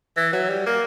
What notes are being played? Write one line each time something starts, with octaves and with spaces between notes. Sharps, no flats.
E3
F#3
G3
A#3